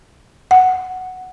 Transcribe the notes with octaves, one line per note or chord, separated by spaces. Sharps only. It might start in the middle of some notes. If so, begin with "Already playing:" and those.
F#5